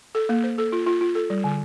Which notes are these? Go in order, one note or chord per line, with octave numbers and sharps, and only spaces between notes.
A4
A#3
C5
A4
F4
F4
F4
A4
G3
D3